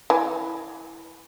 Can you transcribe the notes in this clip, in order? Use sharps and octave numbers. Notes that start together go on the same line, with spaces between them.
E3